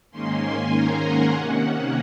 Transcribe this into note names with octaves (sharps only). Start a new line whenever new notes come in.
G#2 D#3 A#3 C#4 C6
G#5
A#5
F#5
C3 D#3 A#3 C#4